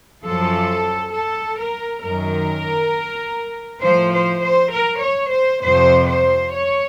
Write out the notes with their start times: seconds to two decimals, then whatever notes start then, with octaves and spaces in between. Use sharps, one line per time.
0.23 F#2 F3 A4
1.13 A4
1.58 A#4
2.03 F#2 D#3 A#4
3.82 A2 F3 C5
4.12 C5
4.43 C5
4.72 A#4
5.02 C#5
5.32 C5
5.62 F2 C3 F3 C5
6.07 C5
6.52 C#5